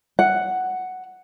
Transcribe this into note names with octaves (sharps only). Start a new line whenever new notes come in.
F#5